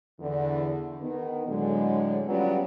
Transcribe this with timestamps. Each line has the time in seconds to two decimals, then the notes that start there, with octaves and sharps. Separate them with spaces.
0.20 E2 D3
1.01 D#3 B3
1.47 A2 D3 F#3 G#3
2.26 F#3 G3 B3 C#4 F4